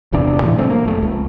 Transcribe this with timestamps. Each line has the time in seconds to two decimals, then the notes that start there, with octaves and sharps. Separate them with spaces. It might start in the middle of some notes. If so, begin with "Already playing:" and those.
0.13 E1 E2 C3 D4
0.42 A2 E3
0.58 B2 F#3 A3 C4
0.70 A#3
0.85 F1 A3
1.02 C#2